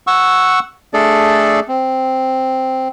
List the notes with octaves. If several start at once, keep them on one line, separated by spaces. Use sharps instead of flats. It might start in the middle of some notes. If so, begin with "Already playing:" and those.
F#5 C#6 E6
A3 D4 G#4 A4 D5
C4